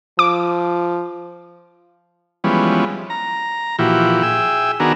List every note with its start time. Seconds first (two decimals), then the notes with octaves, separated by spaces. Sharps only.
0.19 F3 D6
2.44 E3 F3 G3 G#3 B3 C#4
3.10 A#5
3.79 A#2 E3 F3 E4 F#4 G4
4.23 G#4 E5 G5 E6
4.80 D#3 B3 D4 F#4 G#4 A#4